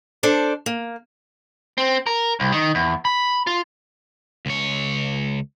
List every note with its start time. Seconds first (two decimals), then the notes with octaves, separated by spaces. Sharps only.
0.23 D4 A4 C5 D5
0.66 A#3
1.78 C4
2.07 A#4
2.40 C2
2.52 D#3
2.75 E2
3.05 B5
3.47 F4
4.46 C#2 C#5